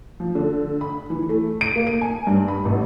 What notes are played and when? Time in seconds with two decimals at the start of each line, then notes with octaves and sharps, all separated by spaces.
0.20 F3
0.35 D3
0.81 B5
1.10 E3
1.29 A3
1.61 D7
1.76 A#3
1.87 D#7
2.01 G#5
2.27 G2
2.48 B5
2.65 A1